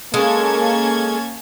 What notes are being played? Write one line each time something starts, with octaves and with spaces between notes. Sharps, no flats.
G#3 A#3 C#4 A4 A5 G#6